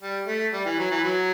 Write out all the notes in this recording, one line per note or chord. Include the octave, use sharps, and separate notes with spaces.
G3
A3
G3
E3
F#3
E3
F#3